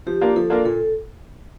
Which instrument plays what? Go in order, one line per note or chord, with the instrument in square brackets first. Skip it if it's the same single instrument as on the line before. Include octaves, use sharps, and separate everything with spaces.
[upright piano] F3 [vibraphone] G4
[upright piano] A#3 D4 F4 A#4
[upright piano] F3 [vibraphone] A4
[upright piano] A#3 D4 F4 A#4
[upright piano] A#2 [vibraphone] A4